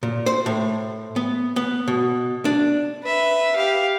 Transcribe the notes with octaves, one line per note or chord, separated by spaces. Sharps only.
A#2
C5
A2
B3
B3
B2
D4
B4 E5
G4 F5